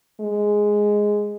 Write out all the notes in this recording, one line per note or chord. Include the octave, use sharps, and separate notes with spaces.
G#3